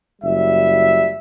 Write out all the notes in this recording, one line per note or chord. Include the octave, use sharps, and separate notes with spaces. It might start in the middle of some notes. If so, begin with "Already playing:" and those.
F#1 G3 E5